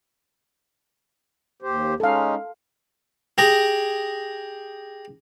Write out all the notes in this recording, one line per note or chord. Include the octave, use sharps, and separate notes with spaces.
D#2 G4 C5
G#3 C#4 D#4 A4 F5
G4 G#4 A#5